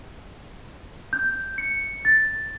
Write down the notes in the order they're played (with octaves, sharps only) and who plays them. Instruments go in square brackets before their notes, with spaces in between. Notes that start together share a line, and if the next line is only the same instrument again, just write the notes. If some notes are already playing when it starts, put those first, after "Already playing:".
[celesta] G6
C#7
A6